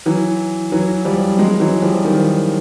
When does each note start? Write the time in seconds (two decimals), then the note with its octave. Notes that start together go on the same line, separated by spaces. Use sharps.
0.06 E3 F#3
0.72 E3 F#3
1.05 F3 G3
1.38 F#3 G#3
1.60 E3 F#3
1.82 F3 G3
2.04 D#3 F3